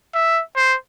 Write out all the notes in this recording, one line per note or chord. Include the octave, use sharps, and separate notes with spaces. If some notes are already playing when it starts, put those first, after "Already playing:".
E5
C5